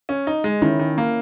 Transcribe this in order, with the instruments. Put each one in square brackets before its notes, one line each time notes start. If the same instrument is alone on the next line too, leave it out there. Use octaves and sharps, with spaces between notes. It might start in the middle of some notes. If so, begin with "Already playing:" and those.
[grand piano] C#4
D#4
G#3
[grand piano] D#3 [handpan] C#4 E4
[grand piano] D#3
A#3